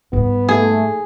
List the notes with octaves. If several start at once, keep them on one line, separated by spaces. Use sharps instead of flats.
G#2 G3 B3
A3 G#4